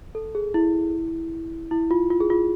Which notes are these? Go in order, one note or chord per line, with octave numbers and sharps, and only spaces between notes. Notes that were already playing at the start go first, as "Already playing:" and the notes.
A4
G#4
E4
E4
F4
F4
G#4
F4